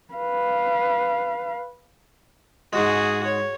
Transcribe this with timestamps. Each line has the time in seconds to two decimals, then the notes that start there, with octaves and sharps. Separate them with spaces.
0.14 B4 F5
2.73 G#2 G#3 F#4 G#4
3.25 C#5